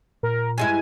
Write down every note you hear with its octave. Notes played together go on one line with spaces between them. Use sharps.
A#2 A#4
G2 G#3 E4 G#5